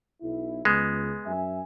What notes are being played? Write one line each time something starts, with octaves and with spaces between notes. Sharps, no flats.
B1 E4
C#2 G#3 B3
F#2 E5 G#5